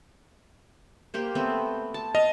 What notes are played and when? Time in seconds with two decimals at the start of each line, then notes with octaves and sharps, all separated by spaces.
1.14 A#3 G4 C5
1.35 A3 B3 C4
1.94 A5
2.15 D#5 F5